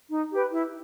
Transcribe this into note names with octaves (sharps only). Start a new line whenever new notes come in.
D#4
G4 B4
E4